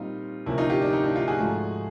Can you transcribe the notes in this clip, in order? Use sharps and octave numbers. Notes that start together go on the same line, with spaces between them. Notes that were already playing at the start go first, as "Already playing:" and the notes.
Already playing: A#2 G3 C4 D#4 F4
D2 C3 F3 A#3 C#4 E4
D#4 F4
F4 G4
D4
D#4
D4 E4
D#4 F4
F#4 G#4
G#2 F3 A3